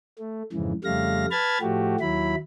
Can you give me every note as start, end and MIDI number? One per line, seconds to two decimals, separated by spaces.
0.19 0.42 57
0.53 0.73 41
0.53 0.73 44
0.53 0.73 49
0.53 0.73 52
0.84 1.26 41
0.84 1.26 49
0.84 1.26 55
0.84 1.26 57
0.84 1.26 77
0.84 1.26 94
1.31 1.58 71
1.31 1.58 81
1.31 1.58 83
1.31 1.58 89
1.31 1.58 92
1.31 1.58 93
1.61 1.96 45
1.61 1.96 53
1.61 1.96 57
1.61 1.96 66
1.61 1.96 67
2.00 2.35 39
2.00 2.35 54
2.00 2.35 64
2.00 2.35 83